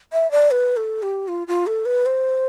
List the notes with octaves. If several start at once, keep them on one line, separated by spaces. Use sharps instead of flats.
E5
D5
B4
A4
G4
F4
F4
A4
B4
C5